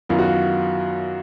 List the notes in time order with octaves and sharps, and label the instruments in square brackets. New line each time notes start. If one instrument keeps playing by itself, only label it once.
[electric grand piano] F#2 D#3 F#3 B3 E4 [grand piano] F4
[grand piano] F#4
F4